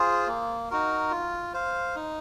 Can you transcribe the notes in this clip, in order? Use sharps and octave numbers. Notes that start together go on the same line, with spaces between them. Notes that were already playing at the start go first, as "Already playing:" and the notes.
Already playing: F4 G#4 C5
A#3
D#4 F#4 A#4
F4
C5 F5
D#4